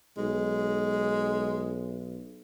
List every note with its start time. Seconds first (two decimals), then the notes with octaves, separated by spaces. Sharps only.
0.18 B1 G#3